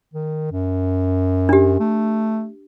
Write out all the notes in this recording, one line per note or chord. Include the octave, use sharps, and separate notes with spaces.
D#3
F#2
D4 G4
A3